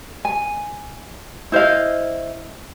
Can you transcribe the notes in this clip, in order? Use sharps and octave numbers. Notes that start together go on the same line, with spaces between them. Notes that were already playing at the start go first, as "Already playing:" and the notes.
G#5
E4 C5 D#5 F5